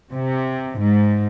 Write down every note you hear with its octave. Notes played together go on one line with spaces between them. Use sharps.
C3
G#2